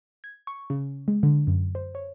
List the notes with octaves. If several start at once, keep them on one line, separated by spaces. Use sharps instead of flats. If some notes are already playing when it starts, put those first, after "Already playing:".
G#6
C#6
C#3
G#3
D3
F#2
C5
C#5